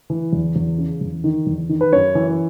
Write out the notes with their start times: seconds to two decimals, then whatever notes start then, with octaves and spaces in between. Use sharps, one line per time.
0.10 E3
0.33 E2
0.56 E2
0.78 C#3
1.01 E2
1.24 D#3
1.47 E2
1.69 D#3
1.81 B4
1.92 F#2 C#5
2.15 E3